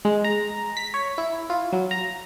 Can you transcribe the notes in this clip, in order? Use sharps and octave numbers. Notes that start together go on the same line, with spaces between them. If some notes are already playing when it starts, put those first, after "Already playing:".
G#3
A#5
B6
C#5
E4
F4
F#3
A#5